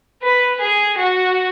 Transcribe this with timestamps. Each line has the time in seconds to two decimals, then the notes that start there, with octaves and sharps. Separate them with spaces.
0.22 B4
0.60 G#4
0.97 F#4